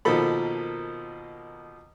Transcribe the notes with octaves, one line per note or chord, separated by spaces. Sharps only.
B2 D#3 F3 A#3 A4 B5